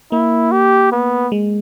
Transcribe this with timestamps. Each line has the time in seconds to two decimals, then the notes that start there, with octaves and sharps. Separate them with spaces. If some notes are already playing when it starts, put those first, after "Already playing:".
0.12 A#3 E4
0.52 G4
0.92 B3
1.32 G#3